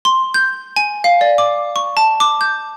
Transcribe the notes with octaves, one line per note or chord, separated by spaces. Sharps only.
C6
G6
G#5
F5
D5
D6
C#6
A5
D6
G6